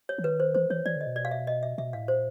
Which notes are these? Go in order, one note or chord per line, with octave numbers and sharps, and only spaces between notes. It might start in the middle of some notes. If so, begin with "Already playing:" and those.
C#5
E3
D#3 B4
C5
E3 C5
E3 C#5
E3 D5
D3 D#5
B2
D5
F5
E5
D#5
E5
B2 E5
A2 F5
A#2 C5